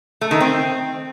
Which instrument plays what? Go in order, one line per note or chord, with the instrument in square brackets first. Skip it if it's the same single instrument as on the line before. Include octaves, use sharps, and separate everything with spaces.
[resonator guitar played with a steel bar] A3
D#3
C4